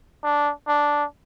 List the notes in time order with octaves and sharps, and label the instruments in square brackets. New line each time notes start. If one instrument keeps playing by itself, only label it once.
[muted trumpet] D4
D4